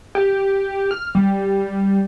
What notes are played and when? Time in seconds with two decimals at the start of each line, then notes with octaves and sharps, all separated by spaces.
0.15 G4
0.91 F6
1.15 G3